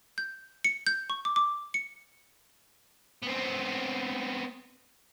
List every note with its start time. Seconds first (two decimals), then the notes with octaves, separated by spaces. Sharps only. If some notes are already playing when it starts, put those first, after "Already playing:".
0.18 G6
0.64 C#7
0.87 G6
1.10 C#6
1.25 D6
1.36 D6
1.74 C#7
3.23 B3 C4